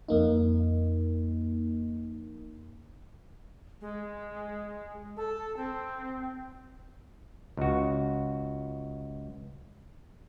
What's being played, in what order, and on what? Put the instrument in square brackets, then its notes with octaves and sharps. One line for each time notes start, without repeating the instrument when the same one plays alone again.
[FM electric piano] F2 A#3 D#4
[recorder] G#3
A4
C4
[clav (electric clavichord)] C#2 F#4